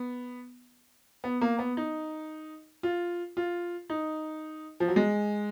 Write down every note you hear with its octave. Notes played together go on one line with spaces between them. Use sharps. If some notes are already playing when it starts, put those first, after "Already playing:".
Already playing: B3
B3
A#3
B3
D#4
F4
F4
D#4
F3
F#3
G#3